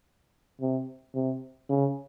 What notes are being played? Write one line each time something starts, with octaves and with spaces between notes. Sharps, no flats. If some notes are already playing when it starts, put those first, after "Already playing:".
C3
C3
C#3